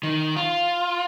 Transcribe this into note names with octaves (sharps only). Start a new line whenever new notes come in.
D#3
F4